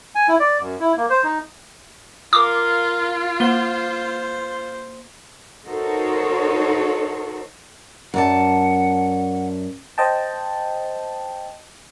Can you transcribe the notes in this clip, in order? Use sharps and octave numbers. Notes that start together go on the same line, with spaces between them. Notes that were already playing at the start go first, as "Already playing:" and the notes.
G#5
E4
D5
F#2
E4
A#3
C5
D#4
F4 A#4 F5 D6
A#3 C5 G7
D#4 F#4 A4 A#4 C5 C#5
F#2 D5 F#5 A5
C5 D#5 G5 A5